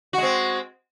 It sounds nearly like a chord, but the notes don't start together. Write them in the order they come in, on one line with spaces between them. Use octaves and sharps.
F#4 G#3 C4